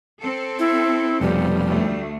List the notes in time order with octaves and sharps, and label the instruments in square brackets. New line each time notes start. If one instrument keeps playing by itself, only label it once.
[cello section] C4 A4
[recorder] E4
[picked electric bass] F1 F2 B2 [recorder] G3
[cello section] D2 A3